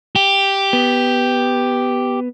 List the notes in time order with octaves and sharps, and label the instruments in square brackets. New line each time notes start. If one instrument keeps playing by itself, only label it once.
[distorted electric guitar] G4
[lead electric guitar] B3